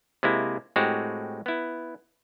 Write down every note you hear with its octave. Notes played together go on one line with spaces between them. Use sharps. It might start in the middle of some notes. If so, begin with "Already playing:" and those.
C3 G#3 A#3 E4
A2 G#3 C4 F#4 G4
B3 E4